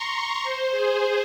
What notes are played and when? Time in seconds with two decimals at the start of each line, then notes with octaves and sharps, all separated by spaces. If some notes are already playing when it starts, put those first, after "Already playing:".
Already playing: A#5 C6 C#6
0.43 C5
0.71 G#4